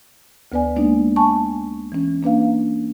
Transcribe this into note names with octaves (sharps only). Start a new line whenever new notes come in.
D2 B3 B4 D5 G#5
G#3 A#3 B3 D4 D#4
G#5 A5 C#6
E3 C#4
A#3 D4 B4 F5